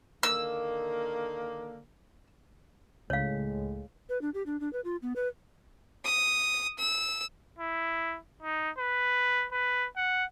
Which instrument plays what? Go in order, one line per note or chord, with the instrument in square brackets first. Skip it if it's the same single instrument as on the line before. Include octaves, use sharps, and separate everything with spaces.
[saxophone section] D3 D#3 A#3 [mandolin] E6
[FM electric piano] C#2 [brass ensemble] A2 G#3 [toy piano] C#5 F5
[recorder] B4
D4
G4
D4
D4
B4
F4
B3
B4
[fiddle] D#6
E6
[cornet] E4
D#4
B4
B4
F#5